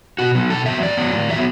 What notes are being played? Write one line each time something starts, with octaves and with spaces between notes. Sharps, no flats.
B2 F#4
F#3 B3
B2 A4
F#3 B3 E5
A2 D5
F#3 B3
A2
F#3 B3 E5